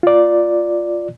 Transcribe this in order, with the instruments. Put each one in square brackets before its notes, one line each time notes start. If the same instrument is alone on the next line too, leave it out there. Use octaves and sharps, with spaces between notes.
[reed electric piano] F4 D5